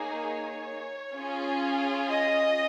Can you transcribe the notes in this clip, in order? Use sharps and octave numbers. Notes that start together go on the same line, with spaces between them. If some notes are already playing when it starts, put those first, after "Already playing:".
Already playing: A#3 D#4 G#4 C#5
C#4 F4 G#4
D#5